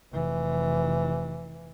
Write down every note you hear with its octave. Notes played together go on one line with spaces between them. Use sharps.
F1 E3